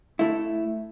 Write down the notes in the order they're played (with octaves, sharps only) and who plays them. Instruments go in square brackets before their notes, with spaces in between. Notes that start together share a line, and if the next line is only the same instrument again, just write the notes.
[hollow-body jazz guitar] A3 E4